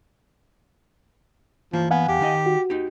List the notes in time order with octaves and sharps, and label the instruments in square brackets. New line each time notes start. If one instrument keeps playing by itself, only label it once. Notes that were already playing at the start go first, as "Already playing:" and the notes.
[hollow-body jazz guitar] E3 A#3 [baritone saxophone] F3
[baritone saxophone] B3 [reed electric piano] F5 F#5 G#5
[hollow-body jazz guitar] E2 [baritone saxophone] G4
[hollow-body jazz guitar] D#3 D#4 D#5
[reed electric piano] F#4
[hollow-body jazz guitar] D#4 G4